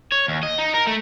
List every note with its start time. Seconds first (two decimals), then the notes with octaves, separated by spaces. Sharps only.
0.12 C#5
0.28 D#2
0.43 D#5
0.59 D#4
0.74 A#4
0.87 A3